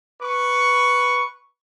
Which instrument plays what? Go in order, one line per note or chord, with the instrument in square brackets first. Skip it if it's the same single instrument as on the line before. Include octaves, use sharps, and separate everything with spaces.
[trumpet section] B4 C#6